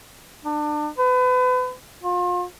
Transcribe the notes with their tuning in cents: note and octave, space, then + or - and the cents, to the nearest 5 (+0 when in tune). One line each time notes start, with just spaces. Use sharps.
D4 +30
B4 +35
F4 +35